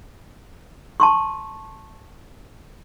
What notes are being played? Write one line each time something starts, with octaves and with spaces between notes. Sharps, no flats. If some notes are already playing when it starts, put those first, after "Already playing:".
A5 C6 C#6